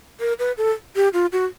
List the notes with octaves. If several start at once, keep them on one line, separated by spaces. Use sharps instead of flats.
A#4
B4
A4
G4
F4
F#4